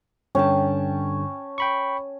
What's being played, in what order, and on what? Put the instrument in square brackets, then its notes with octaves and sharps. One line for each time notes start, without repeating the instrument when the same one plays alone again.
[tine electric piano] G2 D3 [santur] C#4 G5 A5
[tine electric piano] G5 B5 C#6